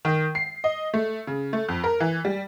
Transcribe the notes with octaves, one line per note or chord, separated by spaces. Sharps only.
D#3
C7
D#5
A3
C#3
A3
F2
A#4
E3
G3